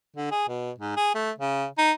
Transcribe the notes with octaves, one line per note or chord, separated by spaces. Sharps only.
D3
G#4
B2
G#2
G#4
A3
C#3
D#4